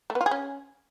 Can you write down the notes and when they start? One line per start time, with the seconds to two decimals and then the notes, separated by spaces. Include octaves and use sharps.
0.10 A3
0.15 B3
0.21 F4
0.26 G#4
0.31 C#4